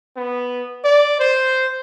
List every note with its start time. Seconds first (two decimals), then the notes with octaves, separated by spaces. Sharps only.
0.17 B3
0.85 D5
1.20 C5